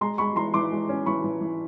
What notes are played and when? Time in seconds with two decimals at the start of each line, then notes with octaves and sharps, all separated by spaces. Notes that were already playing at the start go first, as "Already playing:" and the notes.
0.01 G#3 A#5 C6
0.18 G#3 B5 C#6
0.36 E3 A#5 C6
0.54 E3 C6 D6
0.72 G#3
0.89 C#4
1.06 E3 B5 C#6
1.24 E3
1.41 E3